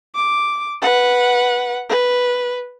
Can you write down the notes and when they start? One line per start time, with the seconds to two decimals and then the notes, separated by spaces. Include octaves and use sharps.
0.15 D6
0.82 B4 F#5
1.89 B4